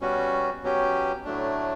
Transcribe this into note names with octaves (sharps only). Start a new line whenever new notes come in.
B2 G3 C#4 F#4
B2 F#3 C#4 G4
A2 F#3 A3 D4